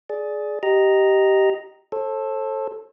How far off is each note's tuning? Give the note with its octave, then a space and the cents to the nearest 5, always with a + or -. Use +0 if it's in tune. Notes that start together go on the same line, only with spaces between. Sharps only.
G#4 +20 D5 -5
G4 -15 D#5 +0 A#5 +0
A4 +0 C5 +45